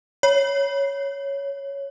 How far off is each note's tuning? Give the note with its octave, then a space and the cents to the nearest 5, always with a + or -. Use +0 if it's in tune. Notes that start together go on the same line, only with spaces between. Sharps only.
C#5 +5